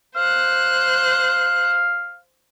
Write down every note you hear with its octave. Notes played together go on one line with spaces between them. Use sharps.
C5 F5 F#6